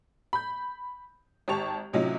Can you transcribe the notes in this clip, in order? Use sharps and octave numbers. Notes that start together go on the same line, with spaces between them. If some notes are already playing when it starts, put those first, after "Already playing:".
B5 G6
G#1 G4 A5 C#6 F7
A2 C3 F#3 C#4 D#4 F4